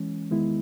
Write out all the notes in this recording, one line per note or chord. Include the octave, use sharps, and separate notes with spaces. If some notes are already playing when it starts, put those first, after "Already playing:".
Already playing: E3 G#3 C#4
E2 D#3 G#3 B3 E4